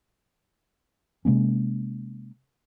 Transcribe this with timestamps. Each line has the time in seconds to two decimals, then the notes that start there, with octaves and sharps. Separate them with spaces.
1.25 C3 G#3 A#3 C#4